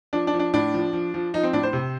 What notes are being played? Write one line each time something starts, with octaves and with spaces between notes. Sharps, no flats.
F3 D4
D4
F3
D4
A2 D4
F3
F3
F3
F3 D#4
C4
A2 D4
C5
C3